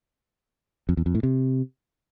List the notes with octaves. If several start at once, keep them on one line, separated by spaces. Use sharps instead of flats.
F2
E2
F2
A2
C3